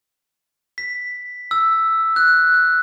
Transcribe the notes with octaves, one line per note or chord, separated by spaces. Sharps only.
B6
E6
F#6
F#6